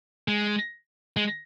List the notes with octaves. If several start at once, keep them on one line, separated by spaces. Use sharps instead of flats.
G#3
G#3